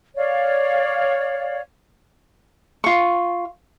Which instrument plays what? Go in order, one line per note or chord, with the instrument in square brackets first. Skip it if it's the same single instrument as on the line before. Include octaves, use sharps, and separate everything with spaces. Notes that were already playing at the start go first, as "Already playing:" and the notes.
[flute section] C#5 D5 F5
[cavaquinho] F4 C#6